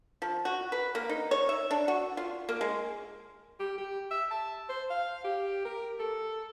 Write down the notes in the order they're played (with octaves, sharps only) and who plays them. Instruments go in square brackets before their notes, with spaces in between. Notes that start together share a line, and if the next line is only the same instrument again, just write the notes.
[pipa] F3
F#4
B4
A#3
D#4
C#5
E5
D4
F#4
F4
A#3
G#3
[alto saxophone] G4
G4
E5
A5
C5
F5
G4
A#4
A4